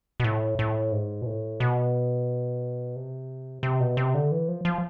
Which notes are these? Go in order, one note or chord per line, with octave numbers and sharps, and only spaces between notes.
B2
A2
A2
G#2
B2
A2
B2
C3
C3
B2
C3
D3
E3
F3
F3